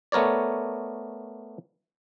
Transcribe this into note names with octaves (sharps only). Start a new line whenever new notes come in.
A3 B3 A#4 C#5 D5